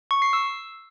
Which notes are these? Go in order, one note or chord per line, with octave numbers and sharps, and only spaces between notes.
C#6
C7
E6